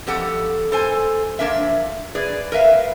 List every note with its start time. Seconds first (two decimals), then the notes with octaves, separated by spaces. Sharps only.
0.07 F2 F3 G4 A4 F#5
0.72 A4 C5 G#5
1.39 F3 G3 A#3 D4 A#4 E5
2.15 G#4 B4 D5
2.52 A#4 B4 E5 F5